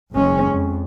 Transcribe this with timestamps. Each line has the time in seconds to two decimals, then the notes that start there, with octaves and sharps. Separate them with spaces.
0.12 F#1 G#3 C#4
0.48 F2